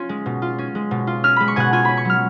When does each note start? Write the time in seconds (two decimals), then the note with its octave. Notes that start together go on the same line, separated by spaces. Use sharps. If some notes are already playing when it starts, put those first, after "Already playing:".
Already playing: C#4 F4
0.09 G#3
0.26 B2
0.42 F4
0.58 C#4
0.75 G#3
0.91 B2
1.07 F4
1.24 C#4 F6
1.36 G#3 B5
1.48 C#6
1.56 B2 F#5 G#5
1.73 F4 G#5
1.85 C#4 B5
1.97 C#6
2.05 F#3 F6